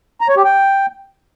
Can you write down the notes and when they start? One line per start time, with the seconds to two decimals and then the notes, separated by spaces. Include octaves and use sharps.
0.21 A#5
0.29 C#5
0.37 G4
0.44 G5